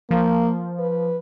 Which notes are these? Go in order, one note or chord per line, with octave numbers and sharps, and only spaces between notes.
F3 A#3
B4